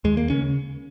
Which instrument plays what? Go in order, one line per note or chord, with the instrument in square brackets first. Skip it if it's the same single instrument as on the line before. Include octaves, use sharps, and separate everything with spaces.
[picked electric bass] D#2 G#3
A#3
C#3 C#4